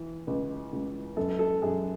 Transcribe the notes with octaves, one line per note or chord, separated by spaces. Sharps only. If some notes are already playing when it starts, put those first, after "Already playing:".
Already playing: E3
C#2
C#2
F#2 A4
A4
F#2 G#4